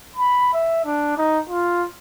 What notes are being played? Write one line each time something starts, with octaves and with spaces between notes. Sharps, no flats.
B5
E5
D4
D#4
F4